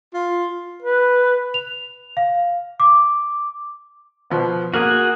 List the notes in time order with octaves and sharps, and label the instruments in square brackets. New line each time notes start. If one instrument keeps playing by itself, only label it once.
[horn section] F4
[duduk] B4
[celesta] F7
F5
D6
[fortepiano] B2 F3 B3
[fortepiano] A#3 F6 [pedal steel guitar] F#4 G#4